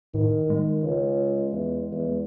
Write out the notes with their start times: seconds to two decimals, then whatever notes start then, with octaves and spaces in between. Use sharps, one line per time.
0.14 A2 D#3
0.50 G#3
0.82 C#2
1.52 E2
1.92 E2